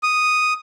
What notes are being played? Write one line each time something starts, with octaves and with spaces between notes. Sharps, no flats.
D#6